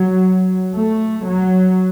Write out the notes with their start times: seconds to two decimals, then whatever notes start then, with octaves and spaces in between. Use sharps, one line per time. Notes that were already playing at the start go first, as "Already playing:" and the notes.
Already playing: F#3
0.75 A3
1.28 F#3